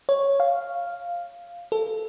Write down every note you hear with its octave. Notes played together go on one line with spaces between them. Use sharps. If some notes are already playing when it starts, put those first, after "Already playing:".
C#5
F5
A4